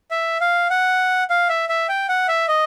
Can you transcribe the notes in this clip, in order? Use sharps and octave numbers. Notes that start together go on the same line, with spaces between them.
E5
F5
F#5
F5
E5
E5
G5
F#5
E5
D#5